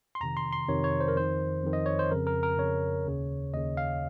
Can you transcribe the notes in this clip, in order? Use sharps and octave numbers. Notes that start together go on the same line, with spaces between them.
C6
F2 C3 D#3 A#5
C6
C6
F2 C3 D#3 C#5
C#5
C5
A#4
F2 D#3 C5
F2 D#3
D#5
C#5
C5
F2 C#3 A#4
A#4
A#4
F2 C#3 C#5
D#2 C#3
D#2 C#3 D#5
F5